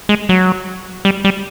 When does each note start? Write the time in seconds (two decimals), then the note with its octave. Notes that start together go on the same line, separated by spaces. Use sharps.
0.09 G#3
0.29 F#3
1.05 G3
1.25 G3